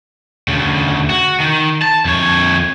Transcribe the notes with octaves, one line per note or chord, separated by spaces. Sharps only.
D2 C#3
F#4
D#3
A5
F2 C#5